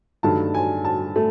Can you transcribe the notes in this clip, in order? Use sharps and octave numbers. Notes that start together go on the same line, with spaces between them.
G2 D#3 F#3 A3 A5
G#5
A5
A3